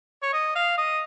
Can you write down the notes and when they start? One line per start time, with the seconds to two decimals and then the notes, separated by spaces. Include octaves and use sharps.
0.23 C#5
0.33 D#5
0.55 F5
0.78 D#5